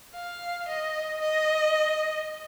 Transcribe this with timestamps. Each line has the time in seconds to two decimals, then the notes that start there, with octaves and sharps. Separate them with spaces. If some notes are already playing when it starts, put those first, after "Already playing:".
0.15 F5
0.69 D#5
1.21 D#5